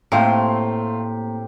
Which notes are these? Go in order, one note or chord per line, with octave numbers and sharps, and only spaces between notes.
A2 A3 A#3 C4 G4 F5 C6